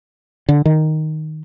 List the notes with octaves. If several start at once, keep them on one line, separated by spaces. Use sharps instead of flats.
D3
D#3